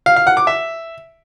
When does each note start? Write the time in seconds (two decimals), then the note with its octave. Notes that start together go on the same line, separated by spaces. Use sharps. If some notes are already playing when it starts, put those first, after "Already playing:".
0.06 F5
0.16 F5
0.27 F#5
0.37 D6
0.47 E5